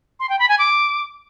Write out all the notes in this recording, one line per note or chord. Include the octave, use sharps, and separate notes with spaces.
C6
G5
B5
G#5
D6